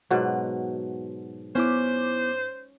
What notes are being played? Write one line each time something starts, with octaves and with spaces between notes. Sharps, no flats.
G#2 B2 F#3
B3 C#4 E4 C5 D6